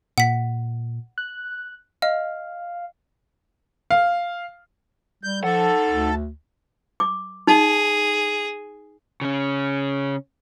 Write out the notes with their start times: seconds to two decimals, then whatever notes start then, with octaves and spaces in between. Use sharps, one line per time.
0.18 A#2 F#5 B6
1.18 F#6
2.02 D#5 F5
3.90 F5
5.24 G3 G6
5.44 F3 D#4 A4 F#5
5.90 D2
7.00 D6
7.47 D#4 G#4
9.21 C#3 C#4